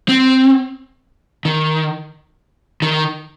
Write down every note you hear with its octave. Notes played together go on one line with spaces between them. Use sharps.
C4
D#3
D#3